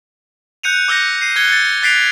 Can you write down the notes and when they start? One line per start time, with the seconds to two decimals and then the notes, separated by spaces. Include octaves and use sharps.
0.63 F#6 G6 C#7 D#7 F7
0.88 D6 E6 G6 A#6 C#7
1.21 C7 D#7
1.36 F#6 G#6 C#7 G7
1.50 A6 C#7
1.83 F#6 A6 B6 C7 D7 F7